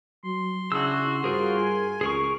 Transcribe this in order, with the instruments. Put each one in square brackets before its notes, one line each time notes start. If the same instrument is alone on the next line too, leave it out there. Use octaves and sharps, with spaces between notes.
[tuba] F#3 [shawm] C6
[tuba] C#3 [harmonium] D4 E4 G#4 [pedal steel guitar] F#4 E6
[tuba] G2 [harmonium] F4 F#4 C5 [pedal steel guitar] G#4 A#4
[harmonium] G#5
[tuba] C#2 [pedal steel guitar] G#4 A#4 C#6